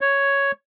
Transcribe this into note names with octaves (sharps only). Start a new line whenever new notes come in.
C#5